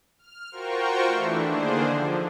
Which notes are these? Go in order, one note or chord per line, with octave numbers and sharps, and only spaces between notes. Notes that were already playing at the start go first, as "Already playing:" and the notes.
F6
F4 F#4 A#4 C5 G5 C#6
E3 A3 D4 E4
D3 D#3 A#3 D4 G#4 C5
D3 F3